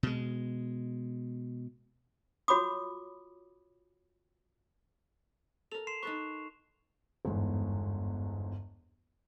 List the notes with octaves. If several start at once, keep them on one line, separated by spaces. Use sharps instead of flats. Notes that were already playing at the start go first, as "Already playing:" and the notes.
B2 G#3
F4 F#4 C#5 B5 D6 D#6
A4 A#4 F7
C6 C7 E7
D#4 A4 B4 C#6
G1 E2 G#2